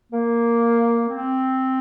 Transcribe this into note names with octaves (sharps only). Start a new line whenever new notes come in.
A#3
C4